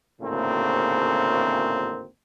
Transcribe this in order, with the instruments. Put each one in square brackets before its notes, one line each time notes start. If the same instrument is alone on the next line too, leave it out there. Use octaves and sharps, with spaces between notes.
[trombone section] G#1 D2 A2 C#3 A#3 C4